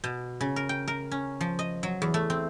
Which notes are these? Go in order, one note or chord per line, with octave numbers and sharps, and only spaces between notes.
B2
C#3
A#4
G5
A#4
C#4
F3
D#5
F#3
E2
A3
C4